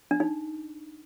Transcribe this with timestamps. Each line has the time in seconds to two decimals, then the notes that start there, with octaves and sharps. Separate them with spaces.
0.11 D4
0.20 D#4